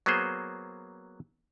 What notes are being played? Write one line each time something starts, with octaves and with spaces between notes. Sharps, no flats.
F#3 A#3 B3 G#4 C5